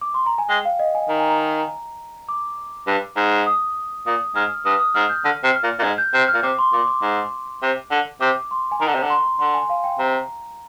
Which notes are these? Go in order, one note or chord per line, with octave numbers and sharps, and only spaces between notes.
D6
C6
A#5
G#5
G#3 G5
F5
D#5
G#5
D#3 A#5
G#5
A#5
D6
G2
G#2
D#6
A#2 D#6
G#2 F6
G2 D#6
D#6
G#2 F6
G6
D3 F6
C3
F6
A#2
A#2
G#2
G6
C3 G6
F6
A#2
C3 D6
C6
A#2 D6
D6
G#2
C3
D3
C3 D6
C6
G#5
D#3 A#5
D3
C3
D3
C6
D3 C6
G#5
F5
G5
C3 A#5